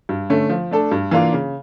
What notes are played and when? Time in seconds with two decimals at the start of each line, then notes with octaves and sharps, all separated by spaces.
0.09 G2
0.30 D3 A3 C#4
0.50 F3
0.71 A3 D4 A4
0.91 G2
1.11 E3 A#3 D4 F4
1.33 C#3